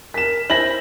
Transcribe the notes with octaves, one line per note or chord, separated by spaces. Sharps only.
A#4 B6 E7
E4 C5 A#6 F#7